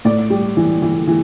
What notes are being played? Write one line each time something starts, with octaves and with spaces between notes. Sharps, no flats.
A2 D5
G3
E3
E3
E3